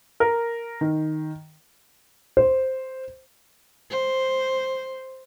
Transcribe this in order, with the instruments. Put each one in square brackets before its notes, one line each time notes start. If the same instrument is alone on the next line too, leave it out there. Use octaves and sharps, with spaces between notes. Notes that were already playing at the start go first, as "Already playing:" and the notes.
[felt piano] A#4
D#3
[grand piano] C5
[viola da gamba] C5